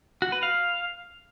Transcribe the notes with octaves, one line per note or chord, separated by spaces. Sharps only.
F#4
B4
F5